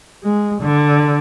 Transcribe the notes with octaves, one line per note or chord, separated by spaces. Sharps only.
G#3
D3